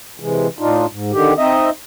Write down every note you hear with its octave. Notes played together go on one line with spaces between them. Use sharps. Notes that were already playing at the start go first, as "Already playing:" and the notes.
C3 E3 G#3
A2 D4 D#4 F4
G#2
D3 D#3 G4
C4 D#4 D#5 E5